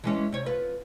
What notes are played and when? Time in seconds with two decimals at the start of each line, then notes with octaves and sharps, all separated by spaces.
0.04 E3 G#3 C#4
0.32 C3 C#5
0.46 F4 B4